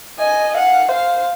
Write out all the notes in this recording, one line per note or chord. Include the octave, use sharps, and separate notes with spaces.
D#5 G#5
F5 F#5
C5 F5